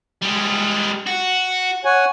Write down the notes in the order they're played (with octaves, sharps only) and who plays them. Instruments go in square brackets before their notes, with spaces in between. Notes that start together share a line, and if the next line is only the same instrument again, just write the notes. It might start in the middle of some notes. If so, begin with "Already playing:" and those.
[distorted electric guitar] G3 G#3
F#4
[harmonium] C#5 F#5 G#5